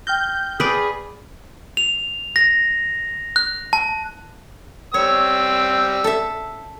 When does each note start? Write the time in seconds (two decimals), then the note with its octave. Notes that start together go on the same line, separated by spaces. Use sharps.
0.07 G5 F6 G6 A#6
0.60 G#4 B4 D5
1.77 F7
2.36 A#6
3.36 F#6
3.73 A5
4.94 G3 C4 C#5 E6
6.04 A4 E5